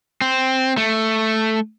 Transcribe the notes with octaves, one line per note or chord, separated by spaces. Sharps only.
C4
A3